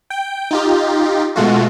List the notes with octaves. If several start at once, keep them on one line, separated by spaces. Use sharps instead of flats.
G5
D#4 F4 G4
B2 G#3 A3 F4 F#4